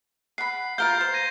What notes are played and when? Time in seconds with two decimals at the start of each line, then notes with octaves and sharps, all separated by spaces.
0.38 F#5 B5 C7
0.78 F4 A#4 F5 G6 G7
1.00 C5
1.13 G#6 A#6 D#7